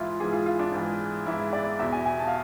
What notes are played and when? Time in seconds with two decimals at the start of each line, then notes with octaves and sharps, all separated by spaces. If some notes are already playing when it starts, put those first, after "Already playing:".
Already playing: G#2 E3 E4 F4
0.20 G#2 E3 G#4
0.33 F4
0.46 F4
0.59 D4
0.72 G#2 E3
1.26 G#2 E3 E4
1.53 D5
1.79 E2 B2 E5
1.92 G#5
2.06 G#5
2.19 A5
2.27 F5